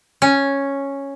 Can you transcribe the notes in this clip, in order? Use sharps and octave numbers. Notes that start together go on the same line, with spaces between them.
C#4